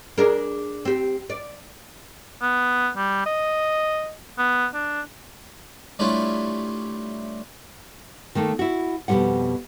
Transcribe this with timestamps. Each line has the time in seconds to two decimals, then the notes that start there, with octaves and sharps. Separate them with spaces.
0.18 D4 G#4 A#4
0.85 C4 G4
1.30 D5
2.42 B3
2.97 G3
3.26 D#5
4.39 B3
4.74 D4
5.99 G3 A3 C#4 D4 E4 F4
8.35 D#3 A3 A#3
8.59 E4 F#4
9.08 F2 B2 D#3 G3 A#3 F#5